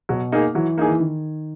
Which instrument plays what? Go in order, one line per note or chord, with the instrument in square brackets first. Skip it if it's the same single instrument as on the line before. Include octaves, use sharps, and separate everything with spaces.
[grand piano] B2 [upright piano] F#3
[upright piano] A#3 D#4 G#4
[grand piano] E3 [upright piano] F#3
[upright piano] A#3 D#4 G#4
[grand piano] E3
D#3